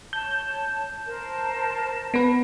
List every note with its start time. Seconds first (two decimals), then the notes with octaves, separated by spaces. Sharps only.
0.13 C#5 A5 G6
1.06 A#4 C5 A5
2.14 B3 B4